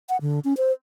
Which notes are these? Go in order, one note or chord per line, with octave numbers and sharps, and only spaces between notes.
F#5
D3
C#4
C5